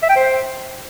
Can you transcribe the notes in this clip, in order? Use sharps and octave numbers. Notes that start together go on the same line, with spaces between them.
E5
G5
C5